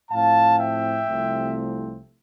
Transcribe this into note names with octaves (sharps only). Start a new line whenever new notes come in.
A2 F3 C4 F5 A5
E5 G5
C2 C3 F3 A3 C4